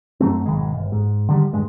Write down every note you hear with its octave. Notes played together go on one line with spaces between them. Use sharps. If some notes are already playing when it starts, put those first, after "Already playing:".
F#2 F#3 A3 C4
G#1 B2 D#3 G#3
G1
G#2
D3 D#3 G3
D#1 G2 G#3